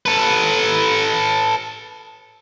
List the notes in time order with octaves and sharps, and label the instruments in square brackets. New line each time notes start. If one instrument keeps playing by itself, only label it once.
[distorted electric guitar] A4 B4